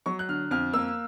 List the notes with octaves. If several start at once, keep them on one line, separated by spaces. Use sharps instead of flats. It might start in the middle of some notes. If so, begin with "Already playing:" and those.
F#3 C#6
F#6
D3 F6
F2 F6
A#3 E6